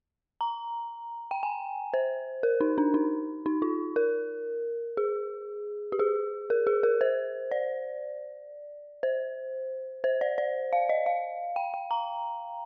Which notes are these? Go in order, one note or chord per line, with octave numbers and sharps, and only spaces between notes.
A#5
G5
G#5
C5
A#4
D#4
D4
D#4
D#4
F4
A#4
G#4
G4
G#4
A#4
G#4
A#4
C5
D5
C5
C5
D5
D5
F5
D#5
F5
G5
G5
A#5